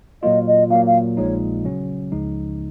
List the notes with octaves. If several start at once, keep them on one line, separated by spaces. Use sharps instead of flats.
A#2 F#3 A#3 F4 D#5
D#5
A#2 F#3 A#3 F5
F5
A#1 A#2 F3 G#3 D#4 C#5
C#3 F#3 C#4
C#2 C#3 F3 G#3 D#4